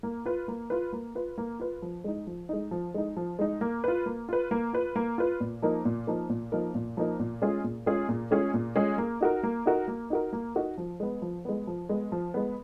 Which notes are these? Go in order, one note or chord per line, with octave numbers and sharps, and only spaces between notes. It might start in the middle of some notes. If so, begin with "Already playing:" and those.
A#3
F4 B4
A#3
F4 B4
A#3
F4 B4
A#3
F4 B4
F3
G#3 D#4
F3
G#3 D#4
F3
G#3 D#4
F3
G#3 D#4
A#3
F4 B4
A#3
F4 B4
A#3
F4 B4
A#3
F4 B4
A#2
F3 A#3 D#4 A#4
A#2
F3 A#3 D#4 A#4
A#2
F3 A#3 D#4 A#4
A#2
F3 A#3 D#4 A#4
A#2
G#3 C#4 F4 G#4
A#2
G#3 C#4 F4 G#4
A#2
G#3 C#4 F4 G#4
A#2
G#3 C#4 F4 G#4
A#3
D#4 F#4 A#4
A#3
D#4 F#4 A#4
A#3
D#4 F#4 A#4
A#3
D#4 F#4 A#4
F3
G#3 B3
F3
G#3 B3
F3
G#3 B3
F3
G#3 B3